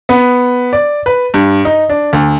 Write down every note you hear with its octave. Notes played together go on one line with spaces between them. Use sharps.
B3
D5
B4
G2
D#4
D4
D2